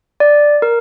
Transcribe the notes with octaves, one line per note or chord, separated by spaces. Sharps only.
D5
A#4